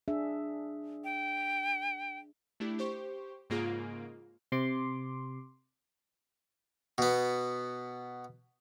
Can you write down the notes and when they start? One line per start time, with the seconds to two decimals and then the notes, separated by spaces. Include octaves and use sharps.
0.08 D4 G#4 E5
1.04 G5
2.60 A3 D4 E4 G4
2.79 G4 C5 C#6
3.50 G#2 C#3 A#3 F4 G#4 D7
4.52 C3 C6 D6
6.98 B2 B3